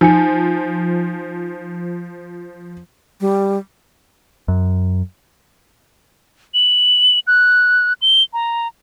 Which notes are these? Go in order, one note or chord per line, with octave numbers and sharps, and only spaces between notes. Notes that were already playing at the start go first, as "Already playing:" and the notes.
F3 D#4 G#5 C#7
G3
F#2
F#7
F#6
G7
A#5